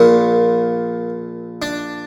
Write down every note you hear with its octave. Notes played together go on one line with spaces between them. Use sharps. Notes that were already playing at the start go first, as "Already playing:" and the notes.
Already playing: A#1 A#2 A#3
D4